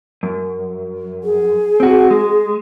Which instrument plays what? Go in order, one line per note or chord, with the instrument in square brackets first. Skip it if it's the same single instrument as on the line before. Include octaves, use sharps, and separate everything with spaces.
[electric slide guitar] F#2
[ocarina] G#4
[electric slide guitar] C4 F#4
G#3